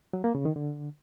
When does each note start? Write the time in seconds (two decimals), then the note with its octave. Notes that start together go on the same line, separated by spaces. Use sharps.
0.13 F#3
0.24 A#3
0.35 C#3
0.45 D#3
0.56 D3